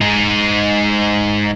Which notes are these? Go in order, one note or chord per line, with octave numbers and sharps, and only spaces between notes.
G#3 D#4